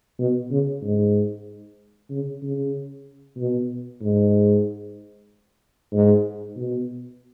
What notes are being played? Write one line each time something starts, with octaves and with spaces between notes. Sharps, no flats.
B2
C#3
G#2
C#3
C#3
B2
G#2
G#2
B2